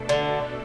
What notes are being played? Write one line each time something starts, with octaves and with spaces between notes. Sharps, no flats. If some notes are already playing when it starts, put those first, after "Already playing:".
Already playing: B2 A3 D4 A4
D3